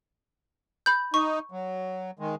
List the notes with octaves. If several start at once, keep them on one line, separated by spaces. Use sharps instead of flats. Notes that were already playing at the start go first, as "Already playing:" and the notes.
B5 G6
D#4 C#6
F#3
D#3 G#3